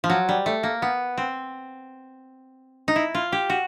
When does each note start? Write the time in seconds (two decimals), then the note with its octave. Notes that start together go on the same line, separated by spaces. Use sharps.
0.04 F3
0.10 F#3
0.29 G3
0.46 A3
0.63 A#3
0.82 B3
1.18 C4
2.88 D#4
2.96 E4
3.15 F4
3.32 G4
3.50 F#4